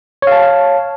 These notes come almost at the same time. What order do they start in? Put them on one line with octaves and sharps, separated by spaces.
C#5 F5 A5